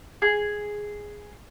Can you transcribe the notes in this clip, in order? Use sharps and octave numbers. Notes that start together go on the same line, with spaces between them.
G#4